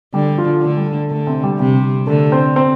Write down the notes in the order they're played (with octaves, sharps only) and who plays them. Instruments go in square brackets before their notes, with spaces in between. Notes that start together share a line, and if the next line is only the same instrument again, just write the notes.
[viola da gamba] D3 [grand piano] G3 G4
[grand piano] F3 F4
[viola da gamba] D3 [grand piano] A3
[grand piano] G3
A3
[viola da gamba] D3 [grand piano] A3
[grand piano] C3 C4
G3 G4
[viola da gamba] C3 [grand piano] G3 G4
[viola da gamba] D3 [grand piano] A3 A4
[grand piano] C4 C5
C4 C5